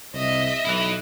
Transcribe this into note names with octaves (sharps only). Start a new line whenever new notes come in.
C2 D#5 E5
B1 E4 B4